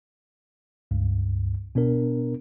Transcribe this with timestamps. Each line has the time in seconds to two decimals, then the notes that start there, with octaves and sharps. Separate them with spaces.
0.91 C#2 G2
1.75 B2 B3 D4 A#4